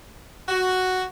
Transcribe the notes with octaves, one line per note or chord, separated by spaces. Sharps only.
F#4